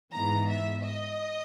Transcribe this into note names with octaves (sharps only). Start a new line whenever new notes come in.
G#2 E3 B3 A#5
E5
D#5